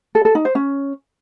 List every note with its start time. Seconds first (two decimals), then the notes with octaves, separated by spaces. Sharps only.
0.15 A4
0.25 A4
0.35 D#4
0.45 C5
0.55 C#4